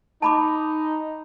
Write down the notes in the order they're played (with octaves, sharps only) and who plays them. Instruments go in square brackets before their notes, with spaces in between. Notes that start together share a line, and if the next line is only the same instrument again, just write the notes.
[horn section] D#4 [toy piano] A5 B5 D6